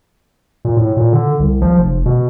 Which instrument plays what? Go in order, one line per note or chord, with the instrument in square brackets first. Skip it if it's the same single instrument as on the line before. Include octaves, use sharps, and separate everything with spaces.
[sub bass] A#2
A2
A#2
D3
C2
F3
F1
B2